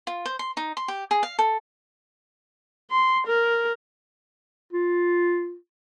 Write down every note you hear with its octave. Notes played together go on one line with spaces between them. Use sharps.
F4
C5
C6
D#4
C6
G4
G#4
F5
A4
C6
A#4
F4